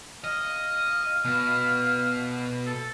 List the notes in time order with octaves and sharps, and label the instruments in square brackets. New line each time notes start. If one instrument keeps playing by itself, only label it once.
[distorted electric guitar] D#5 [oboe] F5
[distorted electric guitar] B2
[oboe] A4